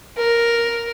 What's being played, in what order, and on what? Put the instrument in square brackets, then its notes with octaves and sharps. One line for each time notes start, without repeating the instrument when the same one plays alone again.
[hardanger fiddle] A#4